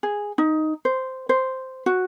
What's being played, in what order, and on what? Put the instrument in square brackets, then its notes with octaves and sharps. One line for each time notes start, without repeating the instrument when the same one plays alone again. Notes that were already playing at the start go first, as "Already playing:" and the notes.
[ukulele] G#4
D#4
C5
C5
F#4